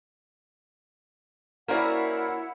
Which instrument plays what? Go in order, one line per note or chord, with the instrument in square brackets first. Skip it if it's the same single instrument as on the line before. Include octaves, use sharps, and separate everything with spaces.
[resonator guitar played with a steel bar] A#3 C#4 F#4 [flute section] E4 F#5 [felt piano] A#4 C5 D5